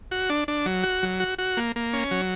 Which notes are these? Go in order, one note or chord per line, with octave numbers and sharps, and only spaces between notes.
F#4
D4
D4
F#3
F#4
F#3
F#4
F#4
A#3
A#3
C#4
F#3